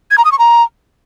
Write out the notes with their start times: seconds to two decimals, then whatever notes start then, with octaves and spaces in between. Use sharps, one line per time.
0.11 G#6
0.18 A#5
0.25 D#6
0.32 C#6
0.39 A#5